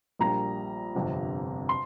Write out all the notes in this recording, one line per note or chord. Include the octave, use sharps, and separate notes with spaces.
A#1 A#2 G3 A#5
G1 F2 C3
C6